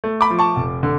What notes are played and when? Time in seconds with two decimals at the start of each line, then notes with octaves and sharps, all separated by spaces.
0.04 A3
0.21 B5 D6
0.30 F3
0.39 A5 C#6
0.56 F1
0.83 D3